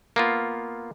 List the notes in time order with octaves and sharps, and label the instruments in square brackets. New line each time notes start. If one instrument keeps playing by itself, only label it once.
[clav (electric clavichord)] A#3 B3 F4